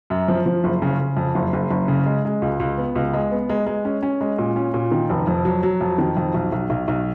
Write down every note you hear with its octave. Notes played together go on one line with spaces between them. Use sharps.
F#2
F3
F3
F#1
C#3
C#3
F2
F#1
F#1
F#1
C#3
G#3
G#3
C#2
C#2
B3
C#2
G#3
B3
G#3
G#3
C#4
C#4
G#3
A#2
C#4
A#2
D#3
F1
F2
F#3
F#3
F2
D#3
F2
B1
B1
B1
B1